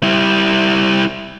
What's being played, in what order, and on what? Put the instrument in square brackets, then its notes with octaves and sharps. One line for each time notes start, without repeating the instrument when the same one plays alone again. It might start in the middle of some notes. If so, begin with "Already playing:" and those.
[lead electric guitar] G3 E4